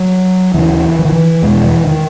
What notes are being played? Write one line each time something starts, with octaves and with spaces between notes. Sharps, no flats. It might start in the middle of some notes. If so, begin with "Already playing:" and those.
Already playing: F#3
D#2 C#3 E3
E3
D#3
E3
E2 B2 G#3
E3
D#3